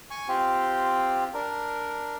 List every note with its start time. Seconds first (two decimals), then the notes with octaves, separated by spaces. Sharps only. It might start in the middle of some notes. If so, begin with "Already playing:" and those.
0.11 G#5 C#6
0.28 C4 F4 G4
1.34 D4 A#4